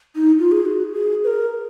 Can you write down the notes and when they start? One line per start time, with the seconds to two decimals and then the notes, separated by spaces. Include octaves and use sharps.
0.16 D#4
0.39 F4
0.52 G#4
0.62 G#4
0.65 F#4
0.93 G#4
1.24 B4
1.27 A#4